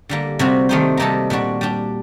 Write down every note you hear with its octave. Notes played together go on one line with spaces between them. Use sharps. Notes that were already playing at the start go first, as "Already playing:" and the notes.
D3 G3 A#3
C3 G3 C4 F#4
D#3 A3 D#4 G4 C5
C3 G3 A#3 D#4 A4
A#2 G3 D4 F#4
G3 D4 G4